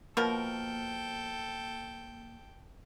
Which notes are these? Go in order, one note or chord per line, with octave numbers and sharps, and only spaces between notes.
B2 F3 A#3 A4 A#4 G5